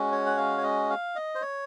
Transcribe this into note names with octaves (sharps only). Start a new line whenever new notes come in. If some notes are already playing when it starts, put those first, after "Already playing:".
Already playing: G#3 C#4 F#4
C#5
F#5
F5
C#5
D#5
F5
D#5
C5
C#5